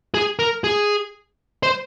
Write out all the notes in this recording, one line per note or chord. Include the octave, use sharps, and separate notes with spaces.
G#4
A#4
G#4
C5